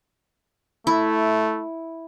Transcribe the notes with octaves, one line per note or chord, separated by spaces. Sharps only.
A3 E4